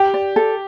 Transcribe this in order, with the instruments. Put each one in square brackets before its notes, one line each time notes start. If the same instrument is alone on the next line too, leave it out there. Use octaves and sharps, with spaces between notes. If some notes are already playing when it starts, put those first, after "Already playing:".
Already playing: [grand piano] G4 [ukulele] G5
[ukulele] D5
A4